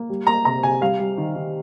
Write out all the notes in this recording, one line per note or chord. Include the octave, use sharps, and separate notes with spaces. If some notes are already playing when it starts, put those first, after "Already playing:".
Already playing: A#3
G3
A#3 A#5
C3 A#5
C3 G#5
G3 F5
G3
D#3
D#3